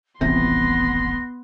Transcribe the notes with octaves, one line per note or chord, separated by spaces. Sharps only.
D#1 A1 C3 B3 C6 A#6